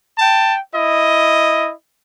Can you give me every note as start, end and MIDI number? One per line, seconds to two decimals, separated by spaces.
0.18 0.57 79
0.18 0.57 81
0.71 1.70 64
0.71 1.70 75